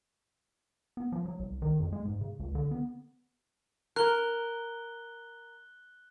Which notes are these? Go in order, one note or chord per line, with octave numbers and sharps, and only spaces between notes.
B3
F3
F#3
C2
D#3
F2
G#3
G#2
C#3
C#2
D3
B3
A#4 F#6 G7